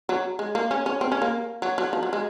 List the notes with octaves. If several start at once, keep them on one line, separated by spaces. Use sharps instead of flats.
F#3
G#3
A#3
C#4
C#4
C4
C#4
A#3
F#3
F#3
F3
F#3
G#3